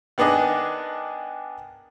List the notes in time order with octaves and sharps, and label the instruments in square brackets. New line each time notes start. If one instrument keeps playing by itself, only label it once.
[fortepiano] D#3 B3 D4 G#4 D#5